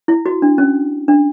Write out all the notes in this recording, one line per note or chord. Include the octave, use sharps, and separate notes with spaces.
E4
F#4
D4
C#4
D4